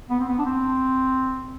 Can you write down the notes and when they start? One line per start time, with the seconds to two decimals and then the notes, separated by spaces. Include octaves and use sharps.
0.10 B3
0.20 C4
0.28 B3
0.39 D4
0.45 C4